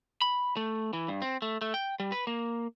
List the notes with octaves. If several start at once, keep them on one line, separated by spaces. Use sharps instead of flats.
B5
A3
E3
G2
C4
A3
A3
G5
G3
B4
A#3